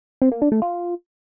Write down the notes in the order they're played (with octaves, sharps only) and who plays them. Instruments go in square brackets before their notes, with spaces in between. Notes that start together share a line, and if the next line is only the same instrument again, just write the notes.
[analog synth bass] C4
A#3
D4
A3
F4